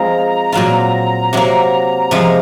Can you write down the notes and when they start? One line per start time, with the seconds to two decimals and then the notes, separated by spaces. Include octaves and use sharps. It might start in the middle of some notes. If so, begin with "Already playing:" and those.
Already playing: F3 G#3 C4 F4 G#4 A#5
0.52 A#2 F#3 C4 F4
1.33 C3 F#3 A#3
2.11 C3 F3 G#3